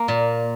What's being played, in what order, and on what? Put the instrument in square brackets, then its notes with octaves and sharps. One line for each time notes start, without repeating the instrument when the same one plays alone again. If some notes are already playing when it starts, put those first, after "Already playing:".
Already playing: [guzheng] A#3
A#2